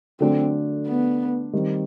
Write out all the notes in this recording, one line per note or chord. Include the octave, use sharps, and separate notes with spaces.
D3 F#3 A3 C4 D4
B3
D#3 G3 C4